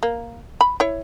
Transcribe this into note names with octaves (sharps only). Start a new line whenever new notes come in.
A#3
B5
E4 C#5